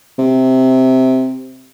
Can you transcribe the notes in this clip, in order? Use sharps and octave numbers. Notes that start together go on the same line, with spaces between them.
C3